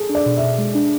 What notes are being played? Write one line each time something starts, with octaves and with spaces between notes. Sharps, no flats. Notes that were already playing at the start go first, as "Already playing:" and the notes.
Already playing: G#4 A4
D4
D5
B2
E5
B2
G#3
D4